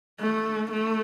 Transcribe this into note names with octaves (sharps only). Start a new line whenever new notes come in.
A3
A3